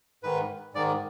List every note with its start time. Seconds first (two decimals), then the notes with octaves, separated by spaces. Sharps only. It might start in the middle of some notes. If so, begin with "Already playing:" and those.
0.23 G#2 D#3 B4
0.74 G#2 D#3 D5